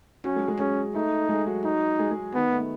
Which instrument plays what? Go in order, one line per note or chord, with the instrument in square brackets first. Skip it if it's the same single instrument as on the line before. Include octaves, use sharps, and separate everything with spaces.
[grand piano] F#3 F#4 [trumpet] C#4
[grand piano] G#3 G#4
G#3 G#4
[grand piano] G#3 G#4 [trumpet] C#4
[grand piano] A3 A4 [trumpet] D#4
[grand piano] G#3 G#4
F#3 F#4
[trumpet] D#4
[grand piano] G#3 G#4
G#3 G#4
[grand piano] D#3 D#4 [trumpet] B3
[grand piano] A3
B3